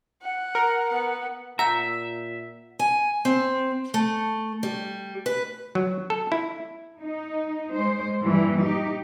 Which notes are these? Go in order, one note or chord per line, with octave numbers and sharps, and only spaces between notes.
F#5
A#4
B3 F#5
A#2 E5 F#5 A#5 E6 G6
G#5
C4
A3
G3
B4
F#3
A4
E4
D#4
G#3 C5
G2 A#2 E3 G3
D#4 G4